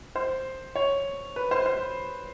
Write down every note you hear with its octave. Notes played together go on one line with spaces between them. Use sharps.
C5
C#5
B4
C5
C5